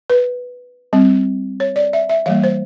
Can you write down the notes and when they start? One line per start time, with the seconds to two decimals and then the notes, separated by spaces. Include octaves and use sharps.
0.10 B4
0.93 G3 C4
1.60 C#5
1.76 D5
1.93 E5
2.09 E5
2.26 E3 G3 A#3 F5
2.43 C5